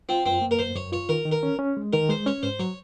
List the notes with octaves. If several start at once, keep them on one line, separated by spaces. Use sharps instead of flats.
C4 F4
F#2 C4
A#3
A#4
F#2 C5
F#2 C#5
F4 C#5
D#3 A#4
D#3
A#4
C#4
C#4
G#3
D#3 A#4
G#3 C5
C#4 C#5
G#2 C5
F#3 C#5